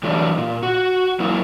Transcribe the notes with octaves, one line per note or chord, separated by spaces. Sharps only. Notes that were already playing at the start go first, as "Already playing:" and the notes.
E3 F#3 G3 A3 D4 D#4
A#2
F#4
F#3 A#3 E4 F4